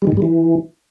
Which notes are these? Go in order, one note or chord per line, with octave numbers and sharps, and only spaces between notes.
G3
D#3
A2
G3
E3